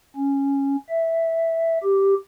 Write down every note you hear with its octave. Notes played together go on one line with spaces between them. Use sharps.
C#4
E5
G4